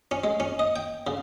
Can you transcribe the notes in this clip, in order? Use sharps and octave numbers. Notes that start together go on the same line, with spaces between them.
C#4
G#3
C#4
D#5
G5
C#3